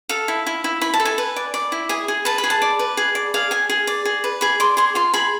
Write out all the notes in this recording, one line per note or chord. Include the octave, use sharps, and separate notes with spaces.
A4 F5
E4
E4
E4
E4 B5
A5
A4
G#5
B4
D5
D5
E4
G#4 G#5
G#4
B4 A5
B5
G#4
A5
D5
B4
G#4
D5
G#4 F5
G#4 G#5
G#4
D5
G#4
B4
G#4 B5
D5 C6
G#4 C6
F4 C6
G#4 B5